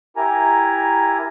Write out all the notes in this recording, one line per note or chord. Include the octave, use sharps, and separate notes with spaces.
E4 G4 A#4 G#5 A#5